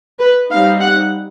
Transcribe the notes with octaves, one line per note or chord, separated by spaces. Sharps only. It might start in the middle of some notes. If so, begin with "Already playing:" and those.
B4
G3 C4 D#4 F5
F#5